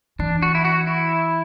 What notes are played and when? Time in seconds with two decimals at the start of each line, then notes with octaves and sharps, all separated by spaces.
0.19 E3 D4
0.42 F#4
0.55 E4
0.65 F#4
0.87 E4